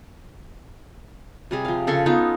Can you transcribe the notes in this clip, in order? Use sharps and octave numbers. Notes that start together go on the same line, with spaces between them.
C3 G3 G#4
F3 F5
C#3 A4 C6 C#6
B3 C#4 D#4 F4